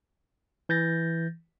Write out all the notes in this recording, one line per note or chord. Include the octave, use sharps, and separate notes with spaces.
E3 G6 A6 A#6